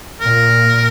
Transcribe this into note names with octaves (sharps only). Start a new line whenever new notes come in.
A#2 A#4